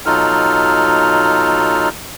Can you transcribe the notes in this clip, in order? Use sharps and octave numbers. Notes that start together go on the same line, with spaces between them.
B2 F#3 D#4 F4 A4 F6